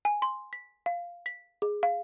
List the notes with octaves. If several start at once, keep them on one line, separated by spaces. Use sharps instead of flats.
G#5
C6
B6
F5
B6
G#4
F5